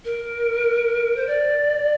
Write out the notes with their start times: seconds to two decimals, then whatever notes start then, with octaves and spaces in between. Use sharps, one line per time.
0.05 A#4
1.17 C5
1.27 D5